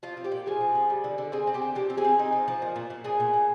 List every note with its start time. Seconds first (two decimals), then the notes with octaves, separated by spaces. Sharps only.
0.03 F3 F4 F5
0.17 C4
0.24 G4 G5
0.32 A#2
0.46 F3 G#4 G#5
0.61 C4
0.75 F3
0.90 G3
1.04 D3
1.18 D3
1.32 C4 G#4 G#5
1.47 C4
1.54 G4 G5
1.62 D3
1.75 F3 G4 G5
1.90 C4
1.97 G#4 G#5
2.04 C4
2.19 D#4
2.33 F3
2.48 F3
2.62 A#2
2.76 A#2
2.90 A#2
3.04 A#2 G#4 G#5
3.20 A#2
3.34 A#2